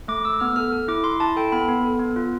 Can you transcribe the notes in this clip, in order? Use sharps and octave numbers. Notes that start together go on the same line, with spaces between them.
A3 D6
A3 E6
B3 F6
A4 F6
A4
E4 D6
E4 C6
E4 A5
A4 G5
B3 B5
B3
A4
B3
F4